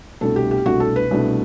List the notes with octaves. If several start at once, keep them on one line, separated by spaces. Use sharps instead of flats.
C2 B2 A3 D4 A4
G4
G4
C2 B2 A3 D4 F#4
A4
B4
C2 B2 A3 D4